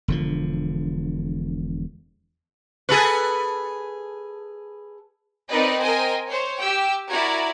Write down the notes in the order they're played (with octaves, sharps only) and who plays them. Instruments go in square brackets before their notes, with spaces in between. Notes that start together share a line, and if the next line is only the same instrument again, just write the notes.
[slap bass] E1 D3 F3
[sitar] G#4 A4 B4
[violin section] C4 D#4 A#4 B4 D5 D#5
A#4 C5 D#5 G5 G#5
C5 C#5
G4 G5 E6
E4 F#4 A#4 D5 A#5 G#6